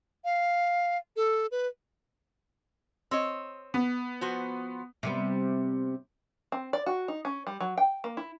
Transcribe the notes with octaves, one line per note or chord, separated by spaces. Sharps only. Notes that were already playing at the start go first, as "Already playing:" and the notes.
F5
A4
B4
C4 C#5 D#5
B3
F3 F#4 C5
C3 G3 B3
C4
D5
F#4
D#4
C#4
G3
F#3
G5
A#3
E4